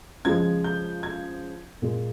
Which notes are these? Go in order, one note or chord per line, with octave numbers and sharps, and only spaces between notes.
C#3 F3 G#3 G#6
G6
G#6
A#2 G#3